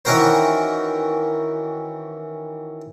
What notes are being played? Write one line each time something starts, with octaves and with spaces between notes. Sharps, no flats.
D#3 E3 C#4 F#4 A#4 C5